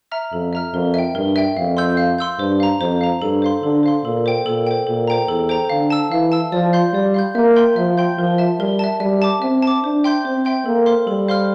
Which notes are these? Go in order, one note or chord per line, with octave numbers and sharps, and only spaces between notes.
E5 A#5 F6
F2 A4
E5 A#5 F6
F2 A#4
E5 G5
G2 A#4
E5 G5
F2 F5
C6 E6 G6
F5
C6 E6 G6
G2 C5
F5 A#5
F2 C5
F5 A#5
G2 A4
C5 F5 C6
D3 A4
C5 F5 C6
A#2 A4
C5 G5
A#2 A4
C5 G5
A#2 A4
C5 G5 A#5
E2 A4
C5 G5 A#5
D3 F5
A5 E6
E3 F5
A5 E6
F3 D5
F5 C6 G6
G3 D5
F5 C6 G6
A#3 E5
G5 C6 G6
F3 E5
G5 C6 G6
F3 A#4
E5 A5
G3 A#4
E5 A5
G3 E5
A5 D6
C4 E5
A5 D6
D4 C5
E5 G5 C6 G6
C4 C5
E5 G5 C6 G6
A#3 A4
C5 F5 C6 F6
G3 A4
C5 F5 C6 F6